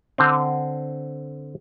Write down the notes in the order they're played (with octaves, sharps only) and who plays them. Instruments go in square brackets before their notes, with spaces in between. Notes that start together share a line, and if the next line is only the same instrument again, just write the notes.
[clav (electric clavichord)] D3 C4